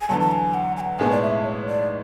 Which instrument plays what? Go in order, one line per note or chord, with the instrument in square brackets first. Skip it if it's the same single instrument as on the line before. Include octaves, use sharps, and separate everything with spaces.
[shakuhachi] G#5
[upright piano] E2 D3 F#3 [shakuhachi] A5
[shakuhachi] A5
G#5
F#5
G#5
F#5
[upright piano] B1 A2 G#3 B3 [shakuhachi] G#5
[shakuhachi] D5
E5
C#5
D5